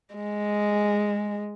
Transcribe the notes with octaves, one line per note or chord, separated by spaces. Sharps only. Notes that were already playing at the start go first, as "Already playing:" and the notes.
G#3